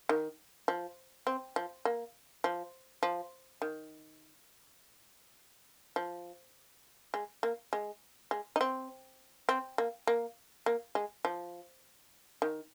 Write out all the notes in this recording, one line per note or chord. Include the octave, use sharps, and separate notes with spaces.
D#3
F3
C4
F3
A#3
F3
F3
D#3
F3
G#3
A#3
G#3
G#3
D#4
C4
C4
A#3
A#3
A#3
G#3
F3
D#3